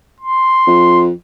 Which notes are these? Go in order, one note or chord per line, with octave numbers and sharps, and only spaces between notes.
C6
F2